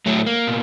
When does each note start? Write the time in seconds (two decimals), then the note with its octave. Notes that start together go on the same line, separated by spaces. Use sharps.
0.06 A2 F#3 A3
0.26 A#3
0.47 B2